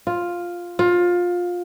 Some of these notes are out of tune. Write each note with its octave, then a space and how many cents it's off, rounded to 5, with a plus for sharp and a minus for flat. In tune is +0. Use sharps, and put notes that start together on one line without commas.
F4 +5
F4 +20